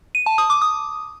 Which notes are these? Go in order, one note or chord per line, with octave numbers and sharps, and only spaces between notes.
D#7
A5
D#6
D6
D#6